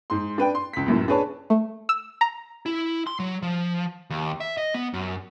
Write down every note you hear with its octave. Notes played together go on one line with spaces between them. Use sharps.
G#2 C6
D4 B4 G5
C6
C#2 B6
C#2 F#2 A2
D4 G#4 B4 C#5 A5
A3
E6
A#5
E4
C6
F#3
F3
D#2
E5
D#5
B3
F#2